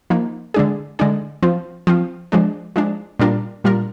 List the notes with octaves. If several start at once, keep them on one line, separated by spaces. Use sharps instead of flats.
F3 A#3 D#4
D3 G#3 D4 G#4
D3 G#3 D4 G#4
F3 C4 F4
F3 C4 F4
F3 G#3 D4
F3 G#3 D4
A#2 G3 D4 F4 A#4
A#2 G3 D4 F4 A#4